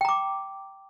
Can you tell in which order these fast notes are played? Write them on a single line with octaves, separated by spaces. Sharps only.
G5 A#5 D6